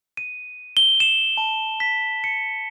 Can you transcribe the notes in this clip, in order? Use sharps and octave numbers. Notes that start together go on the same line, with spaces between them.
D#7
G7
E7
A5
B6
C#7